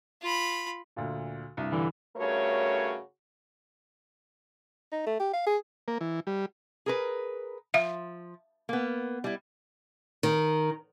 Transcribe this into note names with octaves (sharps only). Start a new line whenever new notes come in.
F4 B5
D2 A#2
C2 G2
D3 E3
G2 C#3 A3 F#4 A#4 C#5
D#4
A3
G4
F5
G#4
A#3
E3
G3
G#4 A#4 B4
F3 E5 F5
A#3 B3
G3 E4
D#3